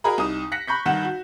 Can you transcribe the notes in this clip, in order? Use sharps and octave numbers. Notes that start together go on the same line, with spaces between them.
F#4 G#4 A#4 D#5 A#5 B5
C2 D#4 D#6 E7
F#6 A#6 B6 C#7 F#7
B5 C#6 G6 B6
G2 D#3 F#5 E7
F#4